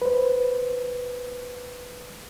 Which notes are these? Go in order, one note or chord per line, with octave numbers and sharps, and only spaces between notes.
B4 C5